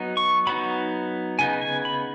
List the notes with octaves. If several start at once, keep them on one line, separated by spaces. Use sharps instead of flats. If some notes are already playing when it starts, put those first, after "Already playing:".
Already playing: F#3 B3 D#4
C#6
F#3 B3 D#4 B5
C#3 B3 D#4 G#5
G#5
B5